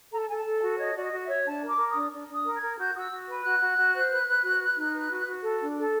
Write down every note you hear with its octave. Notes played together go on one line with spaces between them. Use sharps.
A4 A#5
A5
A4 G#5
A5
A4
F#4
C#5 D#5
F#4 D5
D#5
F#4
E5
C#5
D4 A5
A#4
D6
A#4
D#6
D4
D4
D4
D#6
A#4
G#6
A#4
F#4 G6
F#4 D#6
E6
F#4
B4
F#4 F#6
F#4
F#4
C5
B4
B4
F#4
B4
D#4
B4
F#4
F#4
A4
D4
A4